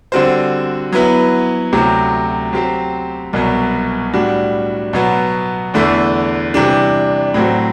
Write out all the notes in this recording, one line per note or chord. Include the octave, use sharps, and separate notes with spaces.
D3 G3 C4 F#4 C5
F#3 B3 E4 B4
D2 C3 F#3
F#3 C4 G4 C5
C2 B2 F#3
A2 G3 D4 F#4
B2 F#3 B3
E2 D3 A3 E4
C3 E3 G3 D4
A2 F#3 C4 F#4